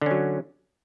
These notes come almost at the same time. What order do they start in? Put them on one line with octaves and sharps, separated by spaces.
D3 C#4 F#3